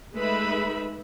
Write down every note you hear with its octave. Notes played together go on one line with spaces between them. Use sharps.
G#3 A3 D#4 B4 E5 B5